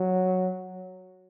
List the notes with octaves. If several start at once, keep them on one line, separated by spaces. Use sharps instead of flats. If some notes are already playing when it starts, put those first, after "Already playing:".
Already playing: F#3